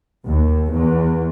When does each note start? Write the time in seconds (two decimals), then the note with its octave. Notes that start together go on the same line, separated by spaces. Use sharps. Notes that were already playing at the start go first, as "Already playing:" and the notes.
0.25 D#2
0.72 E2